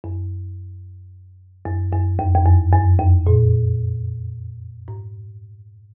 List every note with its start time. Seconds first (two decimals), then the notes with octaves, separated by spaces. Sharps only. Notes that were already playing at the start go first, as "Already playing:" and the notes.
0.04 F#2
1.65 F#2
1.92 F#2
2.19 F2
2.35 F2
2.46 F#2
2.73 F#2
3.00 F2
3.27 A#2
4.88 G#2